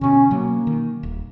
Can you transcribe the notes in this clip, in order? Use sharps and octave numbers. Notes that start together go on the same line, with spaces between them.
B2 D3 C#4
B2 F#3 A#3
D#3
D#1